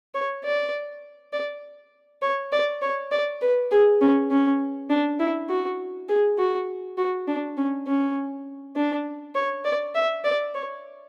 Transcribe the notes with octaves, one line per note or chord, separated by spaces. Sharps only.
C#5
D5
D5
C#5
D5
C#5
D5
B4
G#4
C#4
C#4
D4
E4
F#4
G#4
F#4
F#4
D4
C#4
C#4
D4
C#5
D5
E5
D5
C#5